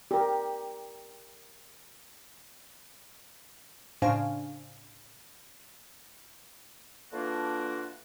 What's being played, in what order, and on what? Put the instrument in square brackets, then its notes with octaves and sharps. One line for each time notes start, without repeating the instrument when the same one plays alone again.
[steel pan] G4 A#4
[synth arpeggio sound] A2 C#3 D4 C5 F5 G#5
[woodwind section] D3 E3 A#3 D4 F4 F#4